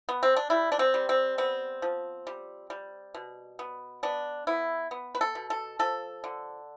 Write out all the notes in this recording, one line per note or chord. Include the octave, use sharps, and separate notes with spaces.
B3
C4
D4
G3 E4
D4
C4
G3
C4
B3 C4
F3
G3
G3
B2
B3
B3 D4
B3 E4
B3
B4
A4
B2
A4
F3 A4
D3